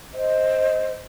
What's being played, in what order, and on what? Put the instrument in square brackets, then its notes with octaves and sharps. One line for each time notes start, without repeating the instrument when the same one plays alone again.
[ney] C5 [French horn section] D#5